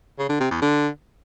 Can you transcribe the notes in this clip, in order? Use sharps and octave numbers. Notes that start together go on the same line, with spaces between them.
C#3
D3
C3
E2
D3